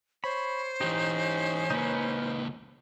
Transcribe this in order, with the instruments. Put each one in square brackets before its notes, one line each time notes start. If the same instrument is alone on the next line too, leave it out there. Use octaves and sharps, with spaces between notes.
[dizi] C5 [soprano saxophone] C#5 [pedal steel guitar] B5
[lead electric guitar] E3 G4 [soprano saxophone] C#4 [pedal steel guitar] D#4
[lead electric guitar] C#2 A#3 [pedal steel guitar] D#4 B4